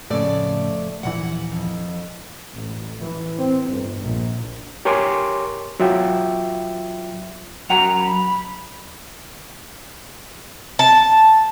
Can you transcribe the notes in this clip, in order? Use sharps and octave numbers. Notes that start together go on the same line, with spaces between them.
F2 A2 C#3 A3 D5
D#1 A#1 E3 F#5
F2
A1
E3
C4
G1
A#1
G4 A#4 C#5 G#5 C6 D6
F#3 F4 E5 G5
F#2 F#5 A#5 F7
B5
A5